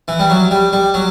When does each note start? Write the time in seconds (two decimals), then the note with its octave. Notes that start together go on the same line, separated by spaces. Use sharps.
0.08 E3
0.20 G3
0.30 F#3
0.51 G3
0.73 G3
0.94 F#3